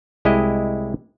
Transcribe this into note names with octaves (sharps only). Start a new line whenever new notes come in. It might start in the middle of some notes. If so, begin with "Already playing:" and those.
C2 G#3 E4 G4 D#5